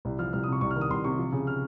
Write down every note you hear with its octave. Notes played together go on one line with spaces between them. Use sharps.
C2
F3 F6
C2 F6
D#6
C3 C#6
C2 C#6
F6
D#3
D#6
C2 C6
C3 C#6
F3
C#3
F6